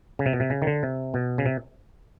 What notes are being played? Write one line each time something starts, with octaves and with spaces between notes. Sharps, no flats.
C#3
C3
B2
C3
C#3
D#3
D3
C3
B2
C#3
C3